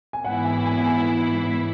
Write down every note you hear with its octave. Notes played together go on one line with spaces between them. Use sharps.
G#5
G#2 E3 B3 E4 F#5
G#5
G#5
G#5